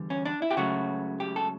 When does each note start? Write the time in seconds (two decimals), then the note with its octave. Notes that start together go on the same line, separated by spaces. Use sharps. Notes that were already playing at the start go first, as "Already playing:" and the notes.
Already playing: E2 D3 G3
0.10 C#4
0.25 D4
0.42 E4
0.51 G4
0.57 C#2 C#3 F#3 A3 F#4
1.20 G4
1.36 A4